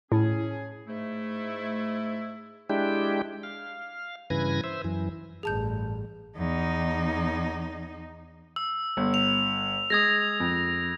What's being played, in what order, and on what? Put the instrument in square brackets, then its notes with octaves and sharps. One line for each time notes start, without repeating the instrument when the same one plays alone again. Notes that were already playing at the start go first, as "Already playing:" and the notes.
[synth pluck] A2 [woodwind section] C#4 G#4
[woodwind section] G#2 A3 E4
[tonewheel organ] G#3 D4 E4 G4 G5
F5
G2 C#3 E3 B4 G#6 A#6
C5 E5
F#2 E3
[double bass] A1 G2 [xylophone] G#4 A5 G6
[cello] E2 D#4
[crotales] E6
[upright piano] G1
[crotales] F7
[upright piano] G#3 [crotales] D#6 G#6 A#6
[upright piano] F2